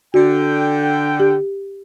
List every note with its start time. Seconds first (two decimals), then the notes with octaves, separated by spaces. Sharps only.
0.14 D3 F#4 G5
1.20 G4